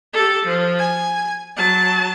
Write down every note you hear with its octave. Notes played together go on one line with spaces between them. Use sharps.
G4 A4
F3
G#5
F#3 A5